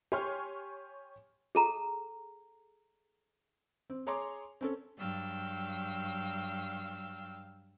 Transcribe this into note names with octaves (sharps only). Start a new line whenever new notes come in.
G4 C#5 G#5 C6 C#6 F6
G#4 A4 A#5
C4
G#4 C#5 A#5 C6 D6
C4 C#4 A4
G2 F#3 F5 G5 E6